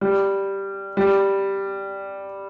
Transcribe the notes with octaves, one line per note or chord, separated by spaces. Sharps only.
G3
G3